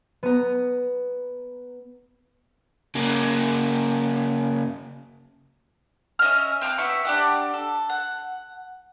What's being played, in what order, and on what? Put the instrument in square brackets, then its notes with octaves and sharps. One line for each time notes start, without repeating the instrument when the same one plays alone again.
[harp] B3 A#5
[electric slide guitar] C#3 A#3
[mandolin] C#4 D#5 E5 F6
C4 F5 D6 F#6
B3 E4 E5 C#6
D4 G4 F#5
A4
F#5